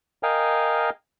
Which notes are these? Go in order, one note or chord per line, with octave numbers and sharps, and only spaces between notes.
A#4 D#5 F5 G5 G#5